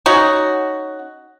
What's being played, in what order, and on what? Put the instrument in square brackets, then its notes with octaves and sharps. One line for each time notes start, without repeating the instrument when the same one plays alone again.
[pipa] C#4 D#4 F#4